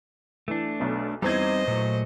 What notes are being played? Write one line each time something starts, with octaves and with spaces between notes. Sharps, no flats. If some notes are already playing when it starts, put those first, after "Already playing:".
E3 A3 D4
B1 B2
E2 G3 C4 D#4 C5 D#5 G#6
A#2 F#3 A3